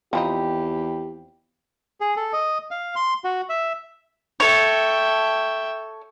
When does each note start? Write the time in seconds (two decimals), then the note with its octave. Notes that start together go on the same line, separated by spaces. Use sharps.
0.13 E2 F3 C4 D#4 G4 G5 B5
2.01 G#4
2.17 A4
2.33 D#5
2.71 F5
2.96 C6
3.24 F#4
3.49 E5
4.40 A4 C#5 E5 G5